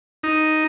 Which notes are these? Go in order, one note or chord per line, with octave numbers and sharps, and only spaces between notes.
D#4